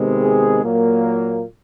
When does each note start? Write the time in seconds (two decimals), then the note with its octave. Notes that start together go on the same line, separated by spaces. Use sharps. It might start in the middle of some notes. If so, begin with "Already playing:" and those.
Already playing: C3 D#3 G#3 B3
0.23 G#4
0.63 A#2 F#3 A#3